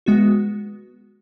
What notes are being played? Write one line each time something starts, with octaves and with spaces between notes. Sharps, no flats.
G#3 B3 F#4